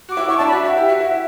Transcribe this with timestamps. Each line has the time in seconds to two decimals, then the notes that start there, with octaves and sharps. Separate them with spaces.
0.09 F#4 D6
0.17 E4
0.29 E4 C#6
0.38 D4 A5
0.47 B5
0.52 F#4 E5
0.65 E4
0.77 G4
0.89 F#4
1.01 E4